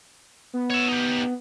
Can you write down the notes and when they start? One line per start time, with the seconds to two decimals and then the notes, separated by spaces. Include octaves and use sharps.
0.53 B3
0.70 C#5 E5
0.88 D#4 G4